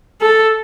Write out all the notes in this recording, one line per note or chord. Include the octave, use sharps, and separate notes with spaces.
A4